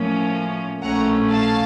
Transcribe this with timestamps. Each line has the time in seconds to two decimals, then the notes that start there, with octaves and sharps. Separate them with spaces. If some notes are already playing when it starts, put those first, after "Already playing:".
Already playing: A2 F3 A#3 C#4
0.82 A#1 A2 A3 C#4 F#5 A#5
1.30 F5 A5